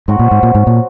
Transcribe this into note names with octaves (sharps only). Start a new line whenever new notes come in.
G#2 F#3 C4 F#4
A#2
G#2
A#2
G#2
A#2